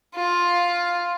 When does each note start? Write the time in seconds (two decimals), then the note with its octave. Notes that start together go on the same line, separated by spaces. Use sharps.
0.15 F4